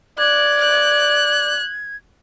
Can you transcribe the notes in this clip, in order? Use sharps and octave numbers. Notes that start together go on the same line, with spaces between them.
D5 F#6 G#6
F#6